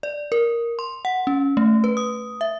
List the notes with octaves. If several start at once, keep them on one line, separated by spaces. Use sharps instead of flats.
D5
A#4
C6
F#5
C#4
A3
B4
D#6
E5